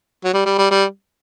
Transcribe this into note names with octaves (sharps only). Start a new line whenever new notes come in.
F#3
G3
G3
G3
G3